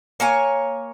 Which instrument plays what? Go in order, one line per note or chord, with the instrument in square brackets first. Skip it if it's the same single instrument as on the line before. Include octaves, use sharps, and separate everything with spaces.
[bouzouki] A#3 C#5 G#5